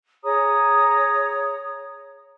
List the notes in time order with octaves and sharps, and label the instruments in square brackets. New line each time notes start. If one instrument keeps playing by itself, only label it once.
[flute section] G#4 C#5 A#5 D#6